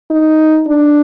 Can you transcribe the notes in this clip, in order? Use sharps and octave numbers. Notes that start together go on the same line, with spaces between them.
D#4
D4